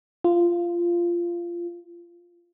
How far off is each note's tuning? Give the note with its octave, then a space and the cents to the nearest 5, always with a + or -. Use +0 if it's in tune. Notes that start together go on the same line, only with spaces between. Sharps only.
F4 -15